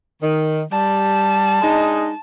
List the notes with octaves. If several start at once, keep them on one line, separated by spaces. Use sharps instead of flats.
D#3
G3 A5
G#3 D4 D#4